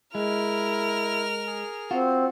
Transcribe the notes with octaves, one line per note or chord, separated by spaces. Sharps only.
G#3 E4 A#4 F6
G#4
C4 F4 F#4